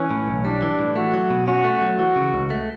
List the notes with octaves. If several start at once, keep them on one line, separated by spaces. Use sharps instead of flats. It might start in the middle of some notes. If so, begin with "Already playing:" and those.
Already playing: E3 C#4
A2
B1
G3 D4
E3
A2
A3 F#4
F#3
B2
C#4 F#4
A3
F#3
E3 F#4
C#3
C#2
A3